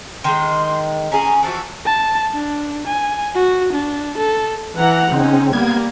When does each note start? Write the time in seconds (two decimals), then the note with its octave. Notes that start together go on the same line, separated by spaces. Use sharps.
0.24 D#3 G#3 C6
1.12 C#4 G#4 A#5
1.43 E3 F3 F#4 A5
1.85 A5
2.34 D4
2.87 G#5
3.35 F#4
3.73 D4
4.18 A4
4.76 E3 F#5 A#5
5.12 C#3 C4 C#4 D#4
5.53 G3 A#3 B3 G#6